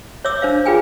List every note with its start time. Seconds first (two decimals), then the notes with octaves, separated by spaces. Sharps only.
0.25 C#5 E5 D6 E6
0.42 D4 C5 F5
0.66 F4 G#4 B4 G5 G#5